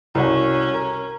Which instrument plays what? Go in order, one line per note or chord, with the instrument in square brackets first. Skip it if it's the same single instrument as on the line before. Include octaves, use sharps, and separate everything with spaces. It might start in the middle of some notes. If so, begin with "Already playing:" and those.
[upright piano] C2 F#4 [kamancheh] C#4
[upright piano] A#4